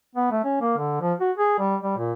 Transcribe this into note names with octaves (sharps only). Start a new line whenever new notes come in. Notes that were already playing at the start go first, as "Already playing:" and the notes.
B3
A3
C#4
A#3
D3
F3
F#4
G#4
G3
G3
A#2